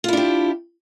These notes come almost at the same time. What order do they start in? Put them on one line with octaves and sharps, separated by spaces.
F4 E4 D4 G4